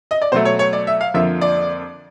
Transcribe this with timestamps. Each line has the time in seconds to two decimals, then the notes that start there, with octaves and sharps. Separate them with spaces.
0.11 D#5
0.22 D5
0.32 B2 F#3 A3 C5
0.45 C#5
0.59 C#5
0.73 D5
0.87 E5
1.01 F5
1.14 F2 D3 F3 A#3 E5
1.41 D5